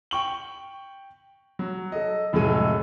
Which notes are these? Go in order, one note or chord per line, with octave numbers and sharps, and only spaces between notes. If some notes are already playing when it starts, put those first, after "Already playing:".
G5 C#6 F#7
F#3
A4 D#5
F1 A2 F#3 G#3 A4 D#7